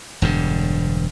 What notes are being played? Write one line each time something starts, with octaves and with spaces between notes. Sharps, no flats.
E1 G2 D3